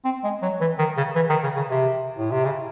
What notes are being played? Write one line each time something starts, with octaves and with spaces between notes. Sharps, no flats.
C4
G#3
F#3
E3
D#3
C#3
E3
D#3
C#3
C#3
C3
A2
C3
C#3